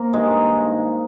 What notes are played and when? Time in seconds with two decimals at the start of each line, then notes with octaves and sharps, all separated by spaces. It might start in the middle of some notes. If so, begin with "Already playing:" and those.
Already playing: A#3 A#4 C5
0.13 G2 D#3 G#3 G#4